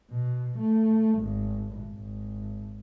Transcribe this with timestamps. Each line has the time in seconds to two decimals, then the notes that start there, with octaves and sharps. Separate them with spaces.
0.11 B2
0.59 A3
1.19 G#1
1.93 G#1